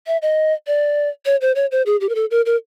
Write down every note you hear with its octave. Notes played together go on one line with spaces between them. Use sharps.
E5
D#5
D5
C#5
C5
C#5
C5
G#4
G4
A#4
A4
A#4
A#4